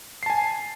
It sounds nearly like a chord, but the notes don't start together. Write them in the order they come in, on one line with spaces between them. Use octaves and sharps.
C7 A5 G#5